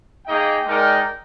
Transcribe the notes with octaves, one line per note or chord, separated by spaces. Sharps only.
A#3 D#4 G#4 D#5 G5
G#3 D#4 A#4 D5 G5